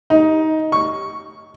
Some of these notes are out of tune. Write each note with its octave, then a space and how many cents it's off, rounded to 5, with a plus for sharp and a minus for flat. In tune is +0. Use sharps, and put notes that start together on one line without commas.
D#4 +15
C#6 +5